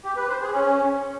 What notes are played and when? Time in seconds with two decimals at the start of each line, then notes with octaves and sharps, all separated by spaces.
0.05 G4
0.17 B4
0.28 C5
0.40 G#4
0.52 C#4